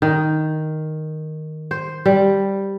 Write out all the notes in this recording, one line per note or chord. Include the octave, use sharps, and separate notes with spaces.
D#3
C5
G3